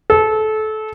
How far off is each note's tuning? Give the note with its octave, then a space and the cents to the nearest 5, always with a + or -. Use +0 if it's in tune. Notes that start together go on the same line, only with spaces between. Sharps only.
A4 -25